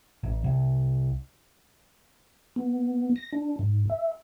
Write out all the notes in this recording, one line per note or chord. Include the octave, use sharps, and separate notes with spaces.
A1
C2
B3
A#6
D4
G#2
E5